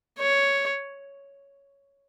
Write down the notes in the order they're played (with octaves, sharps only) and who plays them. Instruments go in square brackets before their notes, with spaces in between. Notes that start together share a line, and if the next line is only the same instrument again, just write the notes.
[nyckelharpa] C#5